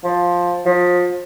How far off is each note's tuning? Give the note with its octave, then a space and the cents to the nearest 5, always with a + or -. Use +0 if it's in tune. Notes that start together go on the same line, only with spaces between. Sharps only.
F3 +10
F3 +30